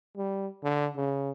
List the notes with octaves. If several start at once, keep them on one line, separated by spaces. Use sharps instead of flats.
G3
D3
C#3